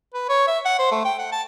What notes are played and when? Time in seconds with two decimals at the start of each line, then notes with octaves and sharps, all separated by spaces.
0.14 B4
0.29 C#5
0.47 E5
0.65 F#5
0.79 C5
0.91 A3
1.05 G5
1.18 F#5
1.32 A5